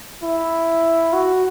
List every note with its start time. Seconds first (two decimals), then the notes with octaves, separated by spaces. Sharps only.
0.23 E4
1.13 F#4